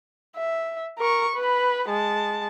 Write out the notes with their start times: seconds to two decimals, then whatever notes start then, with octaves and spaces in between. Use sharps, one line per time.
0.37 E5
0.98 A#4 C#6
1.36 B4 B5
1.89 G#3 A5